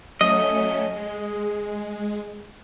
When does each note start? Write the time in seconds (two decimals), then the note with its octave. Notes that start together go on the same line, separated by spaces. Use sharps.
0.21 F#3 A3 C#4 D#5
0.96 G#3